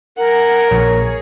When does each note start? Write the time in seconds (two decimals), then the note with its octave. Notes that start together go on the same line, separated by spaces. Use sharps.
0.18 A#4 F#5 G#5
0.71 A#1 G#4 C#5